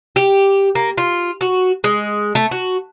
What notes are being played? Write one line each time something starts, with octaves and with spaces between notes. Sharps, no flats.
G4
A#3
F4
F#4
G#3
A3
F#4